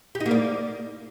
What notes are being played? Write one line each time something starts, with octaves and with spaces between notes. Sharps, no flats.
G4
D#4
A#3
D5